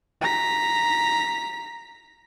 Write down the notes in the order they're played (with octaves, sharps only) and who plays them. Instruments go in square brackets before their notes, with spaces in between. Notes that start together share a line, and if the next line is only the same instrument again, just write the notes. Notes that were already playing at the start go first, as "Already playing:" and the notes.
[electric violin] A#5 B6